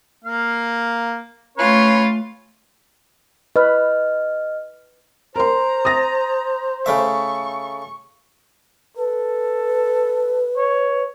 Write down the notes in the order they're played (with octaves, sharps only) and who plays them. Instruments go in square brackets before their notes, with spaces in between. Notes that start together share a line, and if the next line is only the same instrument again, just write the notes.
[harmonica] A#3 F5
[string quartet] A3 F4 [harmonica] C#4 B4 C#5
[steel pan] B4 [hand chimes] D#5 F6
[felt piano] A#4 C6 [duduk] C5 [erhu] A#5
[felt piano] D#6 A6 A#6
[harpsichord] C#3 A3 E5 [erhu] C#6
[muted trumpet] A4 [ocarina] B4
[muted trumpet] C#5